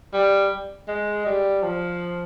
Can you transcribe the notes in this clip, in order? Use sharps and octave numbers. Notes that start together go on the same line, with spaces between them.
G3
G#3
G3
F3